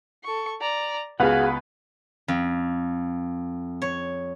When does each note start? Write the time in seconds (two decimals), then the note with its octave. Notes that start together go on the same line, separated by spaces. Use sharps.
0.24 A4 C#6
0.61 D5 A#5
1.20 C#2 B3 F#4 G#4 B4 F5 F#5
2.28 F2
3.82 C#5